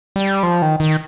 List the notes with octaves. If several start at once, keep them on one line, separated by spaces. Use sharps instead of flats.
G3
F3
D#3
D#3